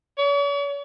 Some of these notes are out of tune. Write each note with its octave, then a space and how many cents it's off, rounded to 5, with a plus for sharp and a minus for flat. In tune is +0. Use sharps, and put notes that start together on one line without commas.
C#5 +45